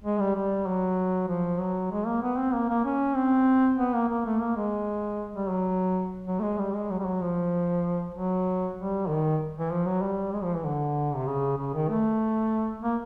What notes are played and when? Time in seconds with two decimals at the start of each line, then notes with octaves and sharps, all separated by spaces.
0.04 G#3
0.20 G3
0.35 G3
0.67 F#3
1.28 F3
1.59 F#3
1.91 G#3
2.06 A#3
2.23 B3
2.38 C4
2.54 A#3
2.69 A#3
2.85 C#4
3.16 C4
3.78 B3
3.94 A#3
4.09 A#3
4.25 A3
4.40 A#3
4.56 G#3
5.35 G3
5.50 F#3
6.27 F#3
6.39 A3
6.43 G#3
6.58 G3
6.74 G#3
6.90 F#3
6.99 G3
7.06 F#3
7.22 F3
8.14 F#3
8.77 G3
9.08 D#3
9.59 E3
9.71 F3
9.86 F#3
10.02 G3
10.33 G#3
10.43 F3
10.55 E3
10.65 D3
11.15 C3
11.26 C#3
11.57 C#3
11.74 D#3
11.89 A3
12.82 A#3